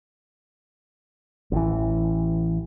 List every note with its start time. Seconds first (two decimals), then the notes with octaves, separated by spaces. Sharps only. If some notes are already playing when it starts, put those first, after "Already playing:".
1.52 A1 E3